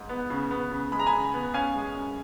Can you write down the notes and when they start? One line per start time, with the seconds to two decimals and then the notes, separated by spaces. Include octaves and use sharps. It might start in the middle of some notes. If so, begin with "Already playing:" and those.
Already playing: G#2
0.09 B3
0.30 C#3
0.51 B3
0.71 C#3
0.92 G#3 B5
1.00 A#5
1.06 G#5 B5
1.13 C#3
1.34 B3
1.54 C#4 F5 G#5
1.76 G#3
1.96 F#2